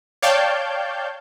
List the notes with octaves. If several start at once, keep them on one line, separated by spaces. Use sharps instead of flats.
C#5 D5 F5 G5 A5 G6